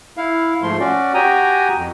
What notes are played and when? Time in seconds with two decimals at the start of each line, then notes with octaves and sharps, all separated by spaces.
0.17 E4 F5
0.63 G#2 F3 A3 C6
0.80 C#4 F#4 D5
1.14 F#4 G4 G5 G#5 A#5 D#6
1.76 F2